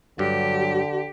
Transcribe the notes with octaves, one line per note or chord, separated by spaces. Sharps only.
G2 D3 F#3 G4